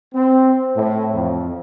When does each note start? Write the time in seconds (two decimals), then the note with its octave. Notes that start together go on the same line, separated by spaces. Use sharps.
0.14 C4
0.75 A2
1.13 F2